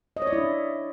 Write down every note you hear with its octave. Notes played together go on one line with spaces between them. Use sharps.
D#5
C#5
D5
E4
D4